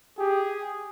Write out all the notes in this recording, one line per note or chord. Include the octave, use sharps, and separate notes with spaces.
G4 G#4